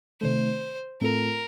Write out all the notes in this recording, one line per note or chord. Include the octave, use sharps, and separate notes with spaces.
C3 D#3 A3 C5
A2 A3 C4 F4 A4 A#4